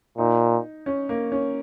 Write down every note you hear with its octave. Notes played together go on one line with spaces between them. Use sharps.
A#2 D#4
C#4
A#3
C#4